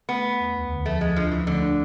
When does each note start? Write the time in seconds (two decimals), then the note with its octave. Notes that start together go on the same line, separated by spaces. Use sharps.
0.09 A3 B3
0.24 A3
0.40 E2
0.55 D2
0.70 D3
0.86 F3 A3
1.01 D2 G#3
1.16 F3 D4
1.31 E3 F3
1.46 D3 A3
1.62 D4